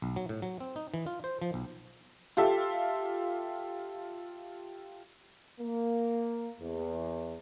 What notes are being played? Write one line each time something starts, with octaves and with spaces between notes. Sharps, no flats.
B1
F#3
A2
F#3
C4
D#4
E3
F4
C5
F3
B1
F4 G4 A4 E5
A#3
E2